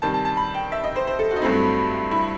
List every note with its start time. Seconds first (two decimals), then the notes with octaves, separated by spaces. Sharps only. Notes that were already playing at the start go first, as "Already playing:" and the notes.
0.02 C3 D#3 G3 A5
0.14 A5
0.25 A5
0.37 B5
0.54 G5
0.72 E5
0.84 D#5
0.96 C5
1.07 C5
1.19 A4
1.31 F#4
1.36 D#4
1.41 G2 F#3 A3 C4 E4
2.11 E4